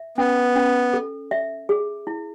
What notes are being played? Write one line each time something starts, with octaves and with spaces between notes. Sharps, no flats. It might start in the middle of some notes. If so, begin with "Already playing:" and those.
Already playing: E5
B3 C#4
C#4
A4
E5
G#4
E4